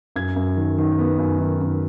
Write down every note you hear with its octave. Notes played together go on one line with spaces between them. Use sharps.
F#2 G#6
F#2
D#3
D#3
B3
F#2
D#3
F#2